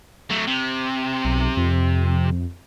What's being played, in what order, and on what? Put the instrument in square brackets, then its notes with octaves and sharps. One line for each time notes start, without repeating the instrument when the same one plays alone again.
[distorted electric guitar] F#3 A3
C3
[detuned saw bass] B1
F2